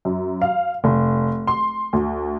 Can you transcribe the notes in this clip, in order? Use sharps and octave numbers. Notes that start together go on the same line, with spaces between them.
F#2
F5
F1
C6
D2